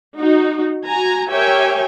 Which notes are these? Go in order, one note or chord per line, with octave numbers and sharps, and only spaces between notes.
D#4 F#4
F#4 G#5 A#5
G4 A#4 C#5 E5 G5 G#5